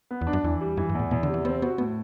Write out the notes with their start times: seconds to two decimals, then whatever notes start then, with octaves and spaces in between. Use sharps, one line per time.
0.11 B3
0.21 E2
0.27 D4
0.33 F#2
0.44 E2 E3
0.61 G3
0.77 F#2 E3
0.89 G2
0.95 E2 A2
1.11 E2 B2
1.23 D3
1.28 C3
1.34 E3
1.45 B3 C4
1.62 B3 F#4
1.78 A2 B3